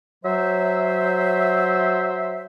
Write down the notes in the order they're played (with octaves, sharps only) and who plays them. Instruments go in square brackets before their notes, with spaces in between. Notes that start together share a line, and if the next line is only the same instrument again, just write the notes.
[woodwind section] F#3 C5 E5